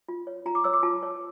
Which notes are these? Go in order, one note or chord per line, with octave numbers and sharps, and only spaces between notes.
F4
C#5
F4 A#5
D6
C#5 E6
D6
F4 A5
C#5